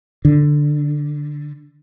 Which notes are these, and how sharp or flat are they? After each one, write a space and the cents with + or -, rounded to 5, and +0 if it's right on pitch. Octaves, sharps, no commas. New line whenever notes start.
D3 +5